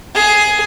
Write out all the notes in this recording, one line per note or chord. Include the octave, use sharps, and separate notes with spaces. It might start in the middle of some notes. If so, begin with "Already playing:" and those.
G#4